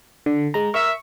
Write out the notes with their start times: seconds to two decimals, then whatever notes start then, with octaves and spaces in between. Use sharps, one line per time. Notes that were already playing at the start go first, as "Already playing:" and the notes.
0.26 D3
0.54 G#3 A#5
0.74 A#4 E5 C#6